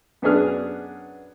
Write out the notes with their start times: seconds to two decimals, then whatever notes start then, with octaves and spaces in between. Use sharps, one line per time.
0.22 F#2 B3 D4 G#4 F6